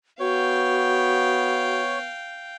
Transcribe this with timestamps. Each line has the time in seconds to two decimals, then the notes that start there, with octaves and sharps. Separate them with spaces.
0.20 B3 F#4 C#5 F5 G5